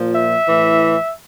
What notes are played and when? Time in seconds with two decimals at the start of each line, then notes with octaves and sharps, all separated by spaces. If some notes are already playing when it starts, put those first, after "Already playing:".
Already playing: A#2 F3
0.15 E5
0.46 A2 E3